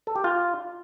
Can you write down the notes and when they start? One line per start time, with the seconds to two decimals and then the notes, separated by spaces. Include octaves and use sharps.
0.07 A4
0.16 G4
0.24 F4